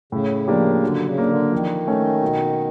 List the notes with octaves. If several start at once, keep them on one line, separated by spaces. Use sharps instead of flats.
A2 C#3
F3 A#3 D4 G4
D3 F#3
C#3
A#3 D4
D3
D#3 F3
A3 C#4
B2